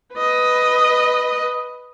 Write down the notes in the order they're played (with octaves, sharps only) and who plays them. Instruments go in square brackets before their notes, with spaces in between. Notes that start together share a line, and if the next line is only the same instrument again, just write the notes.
[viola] B4 D#5